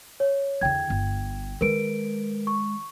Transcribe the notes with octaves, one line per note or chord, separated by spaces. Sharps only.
C#5
E2 D3 G5 G#6
G1
D#3 G#3 A#4 B4 D7
C#6